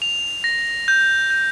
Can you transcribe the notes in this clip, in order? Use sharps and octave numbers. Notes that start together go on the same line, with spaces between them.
F7
A#6
G6
G6